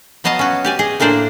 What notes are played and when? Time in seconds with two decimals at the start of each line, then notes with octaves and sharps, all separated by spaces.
0.24 F#3 B3 D#5 F5 A5
0.39 C#4 F#4
0.65 G4 D5 G#5
0.79 G#4 D#5
1.00 A2 A#3 D4 C5 D5